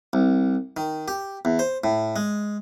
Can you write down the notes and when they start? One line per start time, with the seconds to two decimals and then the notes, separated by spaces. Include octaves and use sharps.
0.13 C2
0.77 D#3
1.08 G4
1.45 E2
1.59 C5
1.84 A2
2.16 G#3